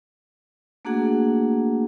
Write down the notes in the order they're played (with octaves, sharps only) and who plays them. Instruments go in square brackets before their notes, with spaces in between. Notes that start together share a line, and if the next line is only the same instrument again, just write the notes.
[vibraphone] A3 A#3 D4 F#4 G#4 F#5